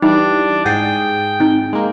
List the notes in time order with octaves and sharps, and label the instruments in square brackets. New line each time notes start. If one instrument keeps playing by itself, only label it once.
[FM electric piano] E3 G3 [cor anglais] D4 [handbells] D#4
[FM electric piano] G#2 G#4 D#6 [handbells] F#5 A6 C7 [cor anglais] G5
[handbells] C4 D#4
[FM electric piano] G#3 A#3